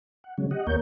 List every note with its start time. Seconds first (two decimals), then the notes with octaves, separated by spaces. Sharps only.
0.24 F#5
0.38 C#3 F#3 G#3 C#4
0.51 G4 D#5 F#5
0.67 D#2 A#3 A#4 C#5 G6